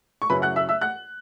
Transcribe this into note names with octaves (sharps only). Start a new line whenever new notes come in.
C#6
F#2 C#3 F#3 C#4 E4 B4 B5
F#5 F#6
E5 E6
E5 E6
F#5 F#6